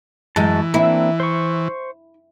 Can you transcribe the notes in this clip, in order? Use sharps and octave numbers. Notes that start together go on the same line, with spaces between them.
F#2 E3 G#3 A5
A#3 C4 D4 E4
C5 C#6